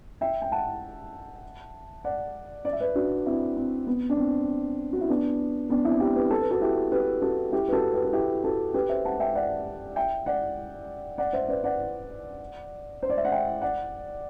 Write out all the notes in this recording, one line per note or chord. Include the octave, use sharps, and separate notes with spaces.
E5 G5
G5
F#5 A5
D5 F#5
D5
E5
B4 D5
D4 F#4
C4 E4
C4
B3
D4
C4
F#4
E4
B3 D4
B3 D4
C4 E4
E4 G4
G4 B4
A4
B4
F#4 A4
E4 G4
G4 B4
F#4 A4
E4 G4
B4
F#4 A4
G4 B4
A4
E4 G4
F#4 A4
G4 B4
C5 E5
F#5 A5
E5 G5
D5 F#5
E5 G5
D5 F#5
D5 F#5
C5 E5
B4 D5
D5 F#5
C5
D5
E5
F#5
E5 G5
D5 F#5